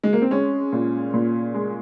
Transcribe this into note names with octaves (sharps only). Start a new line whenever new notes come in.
G#3
A#3
C4
G#3 C#4
A#2
A#2
G#3